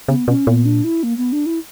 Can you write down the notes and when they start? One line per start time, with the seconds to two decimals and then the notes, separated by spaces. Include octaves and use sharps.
0.08 C#3 B3
0.28 B2 C#4
0.47 A#2 B3
0.65 D4
0.84 E4
1.03 A#3
1.18 B3
1.32 D4
1.46 E4